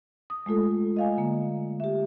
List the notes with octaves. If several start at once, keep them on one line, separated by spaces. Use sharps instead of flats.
D#6
G#3 A3 F4 A4
D#5 F5 G#5
D3 A#3
G4 E5